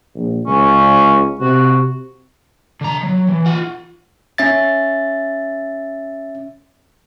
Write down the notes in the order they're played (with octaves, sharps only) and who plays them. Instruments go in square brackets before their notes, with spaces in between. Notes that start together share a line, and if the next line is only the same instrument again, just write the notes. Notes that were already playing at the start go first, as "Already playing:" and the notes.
[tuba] A#1
[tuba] C#2 [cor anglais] C#4
[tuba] C3 [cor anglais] F#4
[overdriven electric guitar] D3 A#5
F#3
E3
F4 F#5
[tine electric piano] C#4 E5 A6